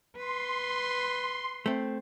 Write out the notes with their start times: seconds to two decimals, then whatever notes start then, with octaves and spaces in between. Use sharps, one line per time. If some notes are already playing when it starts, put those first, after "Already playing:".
0.18 B4 C6
1.66 A3 C4